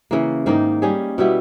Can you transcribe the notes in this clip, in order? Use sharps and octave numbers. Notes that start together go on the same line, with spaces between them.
C#3 E3 A#3
G#2 D#3 A#3 D#4
G3 C#4 G#4
B2 G3 B3 E4